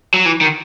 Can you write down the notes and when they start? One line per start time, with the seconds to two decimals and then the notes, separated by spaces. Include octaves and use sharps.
0.14 F#3
0.26 E3
0.41 D#3